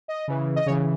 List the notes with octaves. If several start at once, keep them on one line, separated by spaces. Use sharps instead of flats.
D#5
C#3 E3
D#5
C#3 E3 C#5